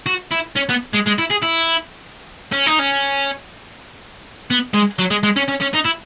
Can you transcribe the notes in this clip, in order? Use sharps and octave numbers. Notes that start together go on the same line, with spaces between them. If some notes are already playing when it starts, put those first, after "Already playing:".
F#4
E4
C#4
B3
G#3
G#3
E4
G#4
E4
C#4
D#4
C#4
B3
G#3
F#3
G#3
G#3
C#4
C#4
C#4
D#4
E4